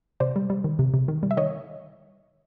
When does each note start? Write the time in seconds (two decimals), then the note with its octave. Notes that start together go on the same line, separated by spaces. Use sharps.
0.20 C3 C5 D5
0.36 G3
0.50 G3
0.64 D#3
0.79 C3
0.94 C3
1.08 D#3
1.23 G3
1.31 E5
1.37 D#3 C#5 D#5